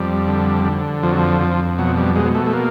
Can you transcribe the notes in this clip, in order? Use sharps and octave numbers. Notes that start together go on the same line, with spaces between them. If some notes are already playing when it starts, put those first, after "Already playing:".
Already playing: F2 G3
D3
D3
F2 F3
F#3
F3
F2
B2 F#3
G3
B2 G#3
A3
A3
A#3